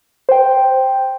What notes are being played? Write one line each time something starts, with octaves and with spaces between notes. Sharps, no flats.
C5 G5